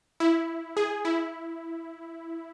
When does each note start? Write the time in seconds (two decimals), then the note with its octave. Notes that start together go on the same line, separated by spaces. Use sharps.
0.20 E4
0.77 G#4
1.05 E4